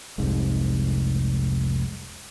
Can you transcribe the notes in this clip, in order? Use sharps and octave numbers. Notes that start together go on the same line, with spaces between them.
F1 C2 G#2